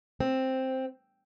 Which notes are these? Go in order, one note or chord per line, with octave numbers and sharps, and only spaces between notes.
C4